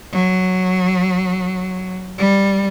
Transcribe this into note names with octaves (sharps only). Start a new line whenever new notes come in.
F#3
G3